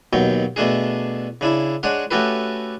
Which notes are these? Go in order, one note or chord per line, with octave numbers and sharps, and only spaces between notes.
D#2 B2 F#3 G5
B2 A3 D4 G#4
C#3 D4 E4
G#3 D4 C#5 F#5
A3 C#4 F#4 G4 A4 B4